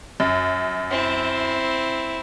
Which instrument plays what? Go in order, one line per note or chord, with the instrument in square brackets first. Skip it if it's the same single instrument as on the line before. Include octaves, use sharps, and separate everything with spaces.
[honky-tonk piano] F#2
[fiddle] C4 E4